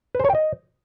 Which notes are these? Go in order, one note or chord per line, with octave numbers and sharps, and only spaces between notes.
B4
C5
C#5
G5
D#5